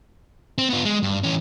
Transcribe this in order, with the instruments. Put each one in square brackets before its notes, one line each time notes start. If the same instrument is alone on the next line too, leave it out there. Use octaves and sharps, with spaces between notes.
[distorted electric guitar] C4
B3 F4
G#3
G2
E3 C#4